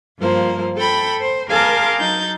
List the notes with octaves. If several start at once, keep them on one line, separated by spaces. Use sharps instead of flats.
G2 F3 A#3 C5
A4 G5 A5 B5
C5
G#4 A#4 F5 A5 C6 D6
F#3 D#4 G6 A6